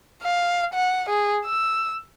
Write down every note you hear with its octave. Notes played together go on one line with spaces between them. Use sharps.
F5
F#5
G#4
E6